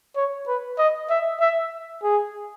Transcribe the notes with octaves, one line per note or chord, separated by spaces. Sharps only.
C#5
B4
D#5
E5
E5
G#4